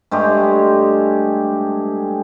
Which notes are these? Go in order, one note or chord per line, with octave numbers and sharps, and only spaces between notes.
G2 G#3 A3 G4